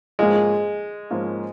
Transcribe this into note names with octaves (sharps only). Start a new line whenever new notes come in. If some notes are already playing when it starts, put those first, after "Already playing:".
G#2 F3 G#3 A#3 C#4 F4
G#2 F3 A#3 C#4 F4